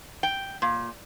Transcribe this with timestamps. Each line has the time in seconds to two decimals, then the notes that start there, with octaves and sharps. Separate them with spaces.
0.23 G5
0.62 A#2